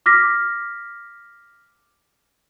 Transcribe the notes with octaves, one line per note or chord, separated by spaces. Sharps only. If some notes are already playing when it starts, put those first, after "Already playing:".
D6 F6 A#6 B6